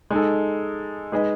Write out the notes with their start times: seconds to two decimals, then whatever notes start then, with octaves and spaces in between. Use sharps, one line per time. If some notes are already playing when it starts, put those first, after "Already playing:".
0.10 G#3 D#4 A4
1.12 G#3 D#4 G#4 B4 D#5